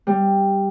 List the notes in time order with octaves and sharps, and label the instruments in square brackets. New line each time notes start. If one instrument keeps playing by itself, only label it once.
[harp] G3